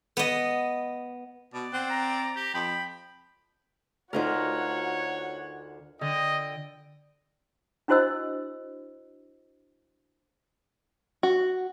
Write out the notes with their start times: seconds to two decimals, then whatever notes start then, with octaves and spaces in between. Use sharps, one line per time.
0.17 B3 D#5
1.54 B2 D5
1.73 C4 F#5
1.90 A#5
2.36 G4
2.54 F2 G5 B5
4.13 D2 D3 D#4 F4 F#4 A#4 C#5 F#5
6.01 D3 D#5 G5
7.88 D4 E4 F#4 C5 D#5 E6
11.23 F#4